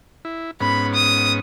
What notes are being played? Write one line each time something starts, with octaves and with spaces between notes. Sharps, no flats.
E4
G#2 B3 C#4 B5
D#6